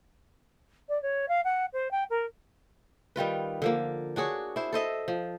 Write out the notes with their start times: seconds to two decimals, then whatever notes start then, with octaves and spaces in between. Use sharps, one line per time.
0.89 D5
1.02 C#5
1.28 F5
1.44 F#5
1.73 C5
1.91 G5
2.10 A#4
3.16 D#3 G3 F4 B4
3.62 D3 F3 A#3
4.16 D4 F#4 G#4 C#5
4.56 E4 C5
4.73 A4 C5 D#5 E5
5.08 F3